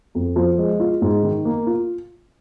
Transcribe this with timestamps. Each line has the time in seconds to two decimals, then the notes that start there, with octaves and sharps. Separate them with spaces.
0.15 F2
0.36 F3
0.58 G#3
0.80 F4
1.02 G#2
1.23 D#3
1.45 A#3
1.67 F4